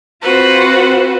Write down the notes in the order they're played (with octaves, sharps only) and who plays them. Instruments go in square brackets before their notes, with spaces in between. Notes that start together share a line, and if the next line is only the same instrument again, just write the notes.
[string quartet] C4 F4 F#4 B4 C5